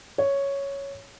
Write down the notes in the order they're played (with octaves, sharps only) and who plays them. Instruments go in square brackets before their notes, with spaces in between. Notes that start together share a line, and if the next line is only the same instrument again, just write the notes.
[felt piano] C#5